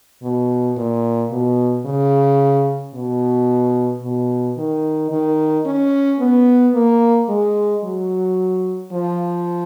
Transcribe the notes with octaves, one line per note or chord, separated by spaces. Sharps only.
B2
A#2
B2
C#3
B2
B2
D#3
D#3
C#4
B3
A#3
G#3
F#3
F3